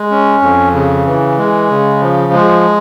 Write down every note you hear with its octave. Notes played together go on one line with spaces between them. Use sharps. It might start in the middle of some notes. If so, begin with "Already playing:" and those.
Already playing: G#3
C#4
F2
C#3
E3
G#3
C#3
F3
G#3